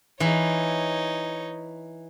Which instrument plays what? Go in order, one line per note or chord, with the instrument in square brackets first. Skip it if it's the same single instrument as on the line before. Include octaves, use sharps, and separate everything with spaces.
[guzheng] E3 [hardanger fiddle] D#4 C#5